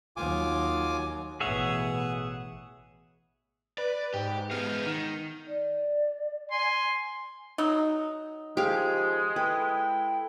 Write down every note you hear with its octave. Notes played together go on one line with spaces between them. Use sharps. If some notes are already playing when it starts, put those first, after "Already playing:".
D#2 F#3 F4 G#5 D6
A1 B2 G#4 C#5 E5 F#5
B4 D5
G#2 G4
G#3 B3 F6 G6
D#3
D5
G#5 C6
F#3 D#4
D#3 F3 G#3 G4 G#4 F5
E4 A4 B4 G5